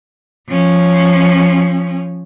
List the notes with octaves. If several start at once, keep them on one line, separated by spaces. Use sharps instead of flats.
F3 C#4